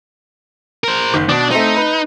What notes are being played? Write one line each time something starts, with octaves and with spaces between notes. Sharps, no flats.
A#4 C5
F#1 D#3
B2 D4
A3 C4 D#4
B4